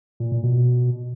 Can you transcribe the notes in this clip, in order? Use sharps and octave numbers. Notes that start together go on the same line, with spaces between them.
A#2
A#2
B2